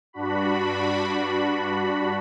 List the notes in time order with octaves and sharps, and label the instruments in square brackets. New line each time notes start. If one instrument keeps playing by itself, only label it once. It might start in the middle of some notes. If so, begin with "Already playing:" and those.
[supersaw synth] G2 D4 F#4 B5